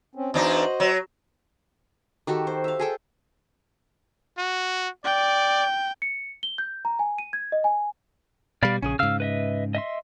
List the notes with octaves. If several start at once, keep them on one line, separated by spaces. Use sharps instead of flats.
C4 C#4
E2 D4 D#4 F#4 C5 D#5
F#3
D#3 F#4 G4 A4
C5
E5 F5
G#4 A4 G5
F#4
D5 G5
C#7
G7
G6
A#5
G#5
D#7
G#6
D#5
G#5
B2 G3 D5 F5 B5
A#1 C#3 C#4 G#4
G#2 C#3 F5 E6 F6
B4 D#5 E5
D#5 E5 C6